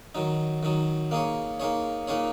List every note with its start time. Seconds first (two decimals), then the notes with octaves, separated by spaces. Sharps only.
0.15 D#3 F#3 D#4
0.63 D#3 F#3 D#4
1.11 A#3 D#4 G#4 C#5
1.60 A#3 D#4 G#4 C#5
2.08 A#2 A#3 D#4 G#4 C#5